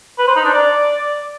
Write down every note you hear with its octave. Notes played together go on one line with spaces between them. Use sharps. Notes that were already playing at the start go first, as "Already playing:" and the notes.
B4
C5
D#4
D4
D5